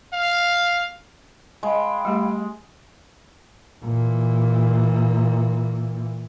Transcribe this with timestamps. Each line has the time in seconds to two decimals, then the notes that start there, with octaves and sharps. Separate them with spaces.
0.13 F5
1.63 G#3 F5 G5 B5
2.05 G3 A3 G4
3.84 A#2 E3